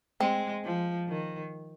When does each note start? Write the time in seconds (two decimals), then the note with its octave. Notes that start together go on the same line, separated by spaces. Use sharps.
0.20 G#3 C4
0.64 F3
1.08 D#3